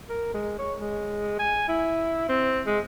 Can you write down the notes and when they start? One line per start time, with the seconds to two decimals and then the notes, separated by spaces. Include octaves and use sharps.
0.09 A#4
0.34 G#3
0.59 C#5
0.80 G#3
1.39 G#5
1.69 E4
2.29 C4
2.66 G#3